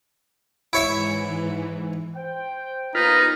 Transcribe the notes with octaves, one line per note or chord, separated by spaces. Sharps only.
G#2 E3 E4 C#5 E5
C5 G5
D#2 B3 D#4 F4 B4 A#5